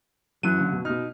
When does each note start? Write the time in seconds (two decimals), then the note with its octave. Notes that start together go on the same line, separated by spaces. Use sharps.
0.43 F#2 E3 F#3 D#7
0.57 F#1 D3
0.72 B2
0.85 B2 D#4 F6